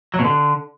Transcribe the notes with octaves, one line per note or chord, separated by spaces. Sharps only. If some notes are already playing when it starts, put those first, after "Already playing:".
F#3
B2
D3